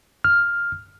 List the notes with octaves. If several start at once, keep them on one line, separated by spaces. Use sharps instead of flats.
F6